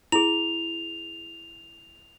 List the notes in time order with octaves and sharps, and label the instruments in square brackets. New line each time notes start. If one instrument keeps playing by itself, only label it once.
[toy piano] E4 G#4 [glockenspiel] F7